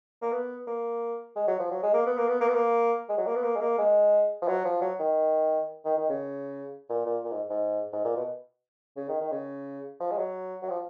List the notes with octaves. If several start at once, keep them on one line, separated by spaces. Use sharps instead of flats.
A#3
B3
A#3
G#3
F#3
F3
F#3
G#3
A#3
B3
A#3
B3
A#3
B3
A#3
G#3
F#3
A#3
B3
A#3
G#3
A#3
G#3
F3
F#3
F3
F#3
D#3
D#3
D#3
C#3
A#2
A#2
A#2
G#2
G#2
G#2
A#2
B2
C#3
D#3
D#3
C#3
F3
G#3
F#3
F#3
F3